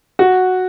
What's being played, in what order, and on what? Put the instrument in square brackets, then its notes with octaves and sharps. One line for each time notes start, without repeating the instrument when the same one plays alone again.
[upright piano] F#4